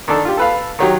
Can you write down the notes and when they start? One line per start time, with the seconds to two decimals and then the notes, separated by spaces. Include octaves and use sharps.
0.08 D#3 D4 A4
0.25 F4 G4
0.37 A4 B4 F5
0.79 D#3 F#3 G4